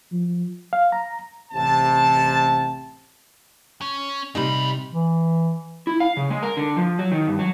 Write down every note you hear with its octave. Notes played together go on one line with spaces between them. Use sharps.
F3
F5
A#5
A1 C3 A5
C#4
C3 G3 G#3 D#4 B5
E3
E4
F5
C#3
G#3
A#4
D3
F3
F#3
D#3
G2
F#3